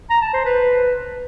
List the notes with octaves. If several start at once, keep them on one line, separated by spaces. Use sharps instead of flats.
A#5
A5
C5
B4